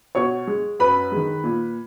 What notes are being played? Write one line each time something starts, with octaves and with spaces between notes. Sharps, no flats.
B2 C#5 C#6
G#3
F#2 B4 B5
D#3 G#3
A#2